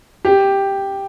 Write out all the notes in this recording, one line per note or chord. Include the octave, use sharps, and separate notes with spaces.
G4